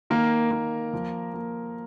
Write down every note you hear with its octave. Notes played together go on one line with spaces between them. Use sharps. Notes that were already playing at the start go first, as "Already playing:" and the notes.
D#3 A#3 A#4
A#3
F3
A#3